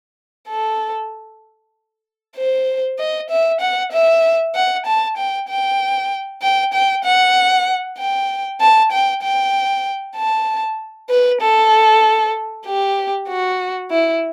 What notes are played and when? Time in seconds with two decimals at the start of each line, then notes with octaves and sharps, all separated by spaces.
0.48 A4
2.37 C5
2.99 D#5
3.30 E5
3.61 F#5
3.92 E5
4.55 F#5
4.86 A5
5.17 G5
5.48 G5
6.42 G5
6.73 G5
7.04 F#5
7.98 G5
8.60 A5
8.92 G5
9.22 G5
10.16 A5
11.10 B4
11.41 A4
12.66 G4
13.29 F#4
13.91 E4